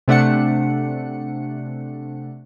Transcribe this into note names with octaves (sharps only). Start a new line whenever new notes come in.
C3 A3 D4 F#5 C#7